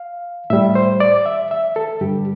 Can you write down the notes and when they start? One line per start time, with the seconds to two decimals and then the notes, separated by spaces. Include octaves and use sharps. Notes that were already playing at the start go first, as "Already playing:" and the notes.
Already playing: F5
0.50 A2 G3 E5
0.75 C5
1.00 D5
1.26 E5
1.51 E5
1.76 A4
2.01 G2 D3 G3 G4